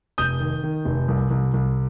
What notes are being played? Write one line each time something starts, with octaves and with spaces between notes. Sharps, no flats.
F1 D#6 G6
D#3
D#3
F1
C2
C2
C2